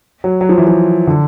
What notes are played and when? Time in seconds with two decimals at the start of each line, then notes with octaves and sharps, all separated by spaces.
0.24 F#3
0.41 F#3
0.49 F3
0.58 E3
0.67 F3
1.07 D3